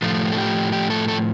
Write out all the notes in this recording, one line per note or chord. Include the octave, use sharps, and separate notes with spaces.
A2 F3 A3 F4
A4
G4
G4
A4
A4